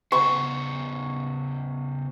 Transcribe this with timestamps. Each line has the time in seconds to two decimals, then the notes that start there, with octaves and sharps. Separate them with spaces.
0.12 C#3 B3 C5 C#6